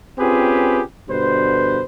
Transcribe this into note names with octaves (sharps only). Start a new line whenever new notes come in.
C4 C#4 F4 G4 G#4 B4
G2 B2 D3 B4 C5